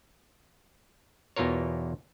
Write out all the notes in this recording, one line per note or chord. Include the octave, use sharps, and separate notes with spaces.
E2 B2 E3 F4 A#4 C#5